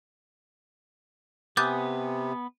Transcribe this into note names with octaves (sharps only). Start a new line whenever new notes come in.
C3 B3 G#5 D6 D#6 F#6 G6 A6